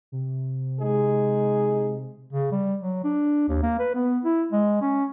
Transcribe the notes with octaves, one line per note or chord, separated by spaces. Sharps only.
C3
G#3 D#4 G#4
C#3
G3
F#3
D4
D#2
A#3
B4
B3
E4
G#3
C#4